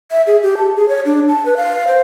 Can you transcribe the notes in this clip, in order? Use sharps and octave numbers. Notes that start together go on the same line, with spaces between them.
E5
G#4
G4
A5
G#4
C#5
D4
A5
B4
F5
C5